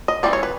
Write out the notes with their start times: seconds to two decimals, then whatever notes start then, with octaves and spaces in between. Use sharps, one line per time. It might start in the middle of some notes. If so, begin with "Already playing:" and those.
0.08 D#5
0.23 E3 G3 C4 D5
0.33 C#5
0.43 B4